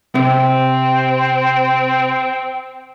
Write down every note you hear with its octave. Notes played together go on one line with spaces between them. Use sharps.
C3 C4